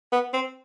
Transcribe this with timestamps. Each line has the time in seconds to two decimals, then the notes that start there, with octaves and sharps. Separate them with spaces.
0.12 B3
0.33 C4